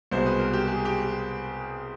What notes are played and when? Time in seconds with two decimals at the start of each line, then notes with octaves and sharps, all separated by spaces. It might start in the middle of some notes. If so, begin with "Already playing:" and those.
0.11 C2 B2 G#3 C5
0.26 B4
0.39 A#4
0.53 G4
0.67 G#4
0.85 G4